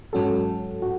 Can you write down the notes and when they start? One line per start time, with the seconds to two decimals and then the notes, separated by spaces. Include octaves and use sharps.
0.13 G#2 F#3 C#4 F#4 A4
0.82 F#4